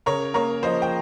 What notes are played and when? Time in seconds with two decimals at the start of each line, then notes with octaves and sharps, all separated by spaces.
0.06 C#3 A#4 C#5
0.34 A#3 A#4 C#5
0.63 F3 C5 D#5
0.82 G5